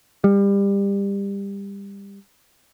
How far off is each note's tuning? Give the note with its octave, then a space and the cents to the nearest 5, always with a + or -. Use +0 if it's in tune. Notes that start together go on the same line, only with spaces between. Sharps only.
G3 +25